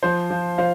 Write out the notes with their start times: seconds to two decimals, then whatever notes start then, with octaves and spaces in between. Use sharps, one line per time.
0.03 F3 C5
0.31 F3
0.58 F3 C5 F5